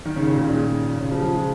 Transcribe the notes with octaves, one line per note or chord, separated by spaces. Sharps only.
D#3
C#3
C#3
A#2
C#3
A#2
C#3
F3
F3
G#3